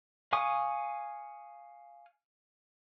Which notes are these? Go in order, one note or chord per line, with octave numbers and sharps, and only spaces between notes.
F5 G#5 C#6 D#6